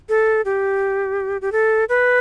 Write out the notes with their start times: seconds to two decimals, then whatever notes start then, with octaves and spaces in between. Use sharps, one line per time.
0.09 A4
0.45 G4
1.42 G4
1.52 A4
1.89 B4